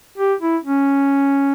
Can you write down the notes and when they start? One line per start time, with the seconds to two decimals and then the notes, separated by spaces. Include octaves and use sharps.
0.18 G4
0.40 E4
0.64 C#4